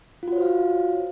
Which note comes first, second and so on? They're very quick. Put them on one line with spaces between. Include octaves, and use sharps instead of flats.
F4 F#4 C#5 C5 F5